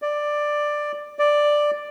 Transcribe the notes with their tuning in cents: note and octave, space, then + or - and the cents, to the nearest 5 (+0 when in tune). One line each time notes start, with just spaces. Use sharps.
D5 +10
D5 +5